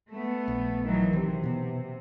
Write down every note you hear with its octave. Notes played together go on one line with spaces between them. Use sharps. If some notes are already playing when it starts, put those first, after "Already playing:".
A3 B3
A#1
D#3 E3 F#3
C3 D#3
B2 B3